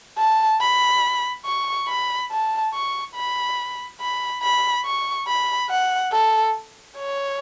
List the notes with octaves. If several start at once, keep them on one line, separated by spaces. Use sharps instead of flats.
A5
B5
C#6
B5
A5
C#6
B5
B5
B5
C#6
B5
F#5
A4
C#5